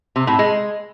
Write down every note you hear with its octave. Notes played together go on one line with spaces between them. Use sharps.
C3
A2
G#3